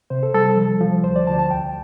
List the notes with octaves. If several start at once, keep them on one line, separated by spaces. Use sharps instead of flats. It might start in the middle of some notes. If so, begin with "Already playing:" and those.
C3 C5
A4
G3 A4
F3
F3
D2 C5
D5
D2 A5
A5
C2 G5